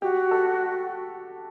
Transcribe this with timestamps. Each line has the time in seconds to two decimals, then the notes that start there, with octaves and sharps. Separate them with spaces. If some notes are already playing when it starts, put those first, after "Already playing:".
0.02 F#4 G4
0.31 A4